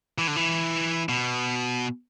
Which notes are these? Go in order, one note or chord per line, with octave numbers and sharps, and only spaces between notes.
E3
D3
E3
B2